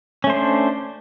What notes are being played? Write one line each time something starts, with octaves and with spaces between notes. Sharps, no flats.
A3 C#4 D4 C5